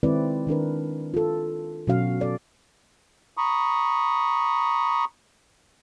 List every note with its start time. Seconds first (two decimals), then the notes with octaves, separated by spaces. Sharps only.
0.03 D#3 G#3 C4 E4 B4 D5
0.47 D#3 D4 A#4 B4
1.14 F4 A4
1.87 B2 F#3 C#4 F#4 F5
2.20 A4 D5
3.37 A#5 B5 C#6 D#6